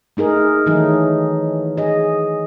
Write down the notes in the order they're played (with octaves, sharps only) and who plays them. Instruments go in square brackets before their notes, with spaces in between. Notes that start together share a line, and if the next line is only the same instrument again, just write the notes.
[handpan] A3 D#4 G#4 A#4
D#3 E3 F#3 A3 D#4 G#4
G#4 D#5